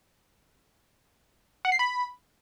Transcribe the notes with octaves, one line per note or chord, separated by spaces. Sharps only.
F#5
C7
B5